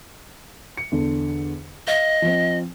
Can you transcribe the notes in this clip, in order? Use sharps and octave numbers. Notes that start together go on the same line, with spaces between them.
C#7
E2 D3
D#5 F5
F3 C4